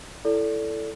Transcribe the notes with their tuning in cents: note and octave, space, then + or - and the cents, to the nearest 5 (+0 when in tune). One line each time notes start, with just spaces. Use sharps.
E4 +15 A4 +0 D5 -25